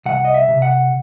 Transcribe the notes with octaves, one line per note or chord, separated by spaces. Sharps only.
C2 F#5
D#5
E5
C3
F#5